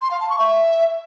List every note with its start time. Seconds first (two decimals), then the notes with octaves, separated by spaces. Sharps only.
0.02 C6
0.11 F5
0.20 A5
0.29 C#6
0.39 E5